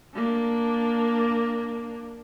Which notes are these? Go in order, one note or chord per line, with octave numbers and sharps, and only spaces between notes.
A#3 D4